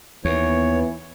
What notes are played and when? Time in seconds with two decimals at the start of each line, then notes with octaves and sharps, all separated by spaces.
0.25 D#2 E3 B3 C#5